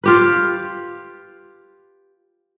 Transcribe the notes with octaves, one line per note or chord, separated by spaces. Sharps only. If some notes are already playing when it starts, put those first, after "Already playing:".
F4 G4 B4